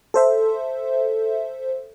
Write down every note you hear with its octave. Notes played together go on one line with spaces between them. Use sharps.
A4 C5 E5